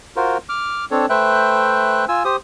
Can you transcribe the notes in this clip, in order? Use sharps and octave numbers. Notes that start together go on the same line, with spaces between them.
F4 F#4 A#4 C5
D6 F6
C4 D4 A4 C#5
A3 B4 C5 E5 G5 F#6
F4 G#5 E6
G4 C5 D#6